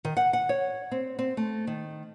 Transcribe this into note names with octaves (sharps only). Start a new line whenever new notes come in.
D#3
F#5
F#5
C#5
C4
C4
A3
D#3